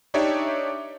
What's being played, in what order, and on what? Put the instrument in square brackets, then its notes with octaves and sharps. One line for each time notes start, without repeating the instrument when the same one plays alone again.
[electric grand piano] D4 D#4 G4 C#5 D5 E5